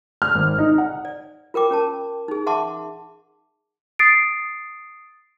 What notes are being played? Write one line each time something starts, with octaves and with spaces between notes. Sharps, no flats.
F6
G#1
D#4
F#5
D5
F4 A#4 G5 D6
C#4 A#4 A5
D#4 G#4
E5 F#5 A5 C6 D6
D#6 A6 C7 D7